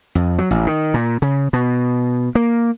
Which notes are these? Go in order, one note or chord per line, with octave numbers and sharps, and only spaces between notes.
F2
F#3
A1
D#3
A#2
C#3
B2
A#3